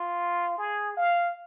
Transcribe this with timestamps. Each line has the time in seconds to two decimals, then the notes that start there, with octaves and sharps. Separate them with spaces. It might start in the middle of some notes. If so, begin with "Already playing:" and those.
Already playing: F4
0.58 G#4
0.97 F5